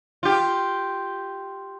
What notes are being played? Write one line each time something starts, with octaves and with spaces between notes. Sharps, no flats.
F4 G4